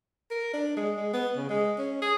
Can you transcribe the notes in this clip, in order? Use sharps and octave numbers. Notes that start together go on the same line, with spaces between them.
A#4
D4
G#3
G#3
B3
C#3
G#3
C#4
G#4